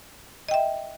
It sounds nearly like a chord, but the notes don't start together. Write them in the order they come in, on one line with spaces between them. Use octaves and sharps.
D#5 G5 E5